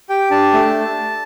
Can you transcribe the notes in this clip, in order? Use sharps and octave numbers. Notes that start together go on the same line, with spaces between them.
G4 G5
D4 A5
A3